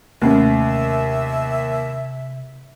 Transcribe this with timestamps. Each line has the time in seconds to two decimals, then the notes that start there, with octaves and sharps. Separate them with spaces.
0.22 D#2 C3 A3 A#3 C#4 E5